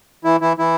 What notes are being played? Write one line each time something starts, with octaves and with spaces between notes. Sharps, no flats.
E3 E4
E3 E4
E3 E4